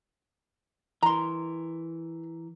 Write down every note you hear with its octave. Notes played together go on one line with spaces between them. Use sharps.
E3 A#4 A#5 C6